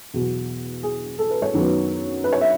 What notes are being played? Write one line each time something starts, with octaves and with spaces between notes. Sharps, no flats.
E2 B2 F#3 F#4
G#4
A4
B4
C#5
F#2 D#3 F#3 B3
B4
C#5
E5